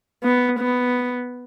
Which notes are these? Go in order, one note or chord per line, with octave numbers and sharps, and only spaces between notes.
B3
B3